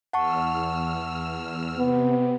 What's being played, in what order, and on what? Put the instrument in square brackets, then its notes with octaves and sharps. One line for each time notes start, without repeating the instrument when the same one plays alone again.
[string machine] E2 E6 F6 [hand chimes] F#5 A5 C#6
[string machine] C3 [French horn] B3